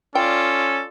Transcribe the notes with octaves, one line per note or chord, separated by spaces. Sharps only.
C#4 F4 A4 D5 G5